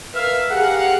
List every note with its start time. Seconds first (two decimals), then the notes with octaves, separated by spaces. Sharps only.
0.14 A#4 B4 E5 F5
0.50 G4 G#4 A#4 F5 F#5